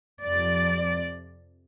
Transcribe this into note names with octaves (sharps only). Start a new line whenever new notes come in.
F2 C3 F3 D5